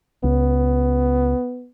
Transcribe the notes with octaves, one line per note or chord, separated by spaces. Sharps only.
C#2 B3